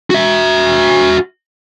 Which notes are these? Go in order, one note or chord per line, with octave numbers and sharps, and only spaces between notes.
F#4 E5